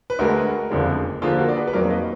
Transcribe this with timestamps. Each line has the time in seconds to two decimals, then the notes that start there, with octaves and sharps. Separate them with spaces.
0.10 B4
0.19 D2 D3 G#3 F#4 A#4
0.70 F#1 F2 D3 G#3
1.22 D#2 D3 F3 A#3 F4 G#4
1.39 F#4 A#4
1.49 D5
1.56 G#4 B4
1.67 B4
1.73 F2 D#3 F#3 A#3 A#4 D5
1.91 B4 D#5